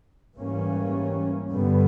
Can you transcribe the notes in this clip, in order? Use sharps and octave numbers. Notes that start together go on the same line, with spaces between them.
G#2 E3 G3 A#3 C#4
G2 D3 G3 B3